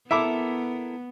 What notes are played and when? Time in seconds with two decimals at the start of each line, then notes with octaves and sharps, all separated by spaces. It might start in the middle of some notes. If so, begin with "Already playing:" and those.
0.11 B3 E4 A4 A#4 E5 B5 D6